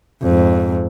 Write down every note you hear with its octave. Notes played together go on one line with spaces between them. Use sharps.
F2 G#2